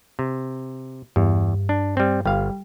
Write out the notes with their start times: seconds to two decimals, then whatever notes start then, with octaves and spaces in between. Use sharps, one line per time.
0.19 C3
1.16 E2 G2
1.69 D4
1.97 G3 C4
2.25 G1 G3 F5